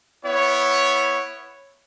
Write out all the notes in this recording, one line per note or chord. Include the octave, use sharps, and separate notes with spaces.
B3 E4 C#5